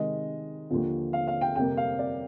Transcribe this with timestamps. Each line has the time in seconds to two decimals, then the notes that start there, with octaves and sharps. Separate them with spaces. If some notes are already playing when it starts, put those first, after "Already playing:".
Already playing: C3 D#3 G#3 D#5
0.70 D#2 D3 F3
1.13 F5
1.28 F5
1.41 G5
1.55 F2 C3 G3 A#3 G5
1.77 F5
1.99 D5